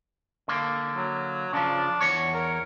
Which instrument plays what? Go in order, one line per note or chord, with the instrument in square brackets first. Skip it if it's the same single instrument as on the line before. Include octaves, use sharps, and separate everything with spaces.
[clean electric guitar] D3 A#3
[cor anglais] F#3
[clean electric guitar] C#3 F3 [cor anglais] D4
[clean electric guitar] E2 C#5
[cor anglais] A#4